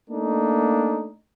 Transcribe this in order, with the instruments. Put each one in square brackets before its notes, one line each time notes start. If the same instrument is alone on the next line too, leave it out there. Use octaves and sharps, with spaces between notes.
[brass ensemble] A3 A#3 D4 D#4